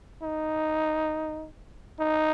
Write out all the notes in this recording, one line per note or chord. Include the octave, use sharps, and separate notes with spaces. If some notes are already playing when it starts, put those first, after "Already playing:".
D#4
D#4